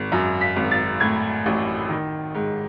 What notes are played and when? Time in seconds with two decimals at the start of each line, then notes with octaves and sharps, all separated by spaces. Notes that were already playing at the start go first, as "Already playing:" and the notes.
Already playing: G#1
0.12 F#2
0.41 B6
0.56 G#1
0.71 A6
1.00 A2 G#6
1.46 A1
1.89 D#3
2.35 G#2